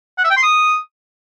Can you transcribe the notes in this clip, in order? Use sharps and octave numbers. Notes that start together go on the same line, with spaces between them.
F#5
E5
G5
C6
D#6